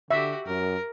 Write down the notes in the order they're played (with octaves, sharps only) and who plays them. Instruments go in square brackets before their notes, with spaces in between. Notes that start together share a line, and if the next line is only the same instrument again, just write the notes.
[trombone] D3 [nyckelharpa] F#4 G4 [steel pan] E5
[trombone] F#2 [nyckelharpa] A#4